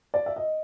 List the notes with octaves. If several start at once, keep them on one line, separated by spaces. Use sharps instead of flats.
D5
E5
D#5